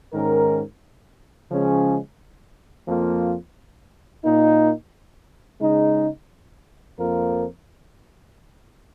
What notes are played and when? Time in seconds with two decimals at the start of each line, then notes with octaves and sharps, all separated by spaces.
0.13 G#2 D#3 C#4 A#4
1.50 C#3 F3 G#3 C#4 G#4
2.87 F2 F3 A#3 F4
4.23 A#2 A#3 D#4
5.60 C#3 G#3 D#4
6.98 F2 F3 A#3 F4 A#4